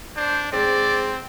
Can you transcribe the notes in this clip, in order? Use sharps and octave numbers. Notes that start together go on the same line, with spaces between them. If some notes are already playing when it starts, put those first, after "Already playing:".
D4 C5
G#2 C4 D5